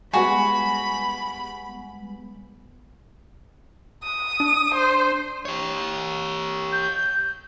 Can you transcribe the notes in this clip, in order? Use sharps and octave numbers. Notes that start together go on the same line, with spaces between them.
G3 G#3 B3 F#4 G#5 B5
D#6
D4
C5
G4 C#5
G6